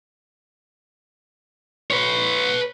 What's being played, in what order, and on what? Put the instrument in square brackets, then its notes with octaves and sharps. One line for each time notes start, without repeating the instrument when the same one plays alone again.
[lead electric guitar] B4 C#5